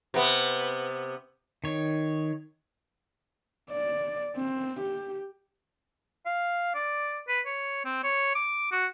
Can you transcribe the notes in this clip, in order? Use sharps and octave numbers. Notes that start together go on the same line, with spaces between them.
C3 B3
D#3 C#5
D5
C4
G4
F5
D5
B4
C#5
C4
C#5
D6
F#4